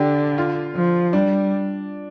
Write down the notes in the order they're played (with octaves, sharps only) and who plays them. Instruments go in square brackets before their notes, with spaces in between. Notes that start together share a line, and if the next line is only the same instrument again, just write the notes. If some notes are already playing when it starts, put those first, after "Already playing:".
Already playing: [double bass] D3 [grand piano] D4 G4
[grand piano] F4
[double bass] F3
[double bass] G3 [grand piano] D4